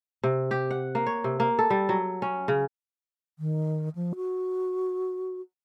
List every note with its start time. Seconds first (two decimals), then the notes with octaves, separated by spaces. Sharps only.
0.23 C3
0.51 G4
0.71 F#5
0.95 A#3
1.06 C#5
1.24 C3
1.40 A#3
1.59 A4
1.70 G3
1.89 F#3
2.22 C#4
2.48 C#3
3.39 D#3
3.95 F3
4.15 F#4